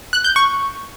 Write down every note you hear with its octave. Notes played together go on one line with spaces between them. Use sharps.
F#6
G6
C#6